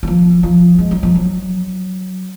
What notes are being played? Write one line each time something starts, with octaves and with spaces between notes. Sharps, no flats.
F#3
F3
F3
G#3
F#3
F3
F#3